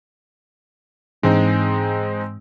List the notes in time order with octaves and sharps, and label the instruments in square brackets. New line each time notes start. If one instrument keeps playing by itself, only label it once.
[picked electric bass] G#2 E3 D4 [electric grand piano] G#3 C4 D#4